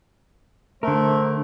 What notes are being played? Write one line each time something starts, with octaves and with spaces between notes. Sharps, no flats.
D3 A3 A#4 C5